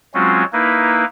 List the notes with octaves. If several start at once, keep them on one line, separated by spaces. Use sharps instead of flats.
F#3 G#3 C4 C#4 F4 F#4
A#3 D#4 E4 B4